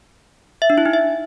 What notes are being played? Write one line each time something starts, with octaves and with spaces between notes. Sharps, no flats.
E5
D4
E4
D#4
E5